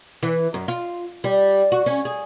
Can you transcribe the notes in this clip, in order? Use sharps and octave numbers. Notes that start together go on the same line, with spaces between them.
E3
F#2
F4
G3
F#4
C#4
G#4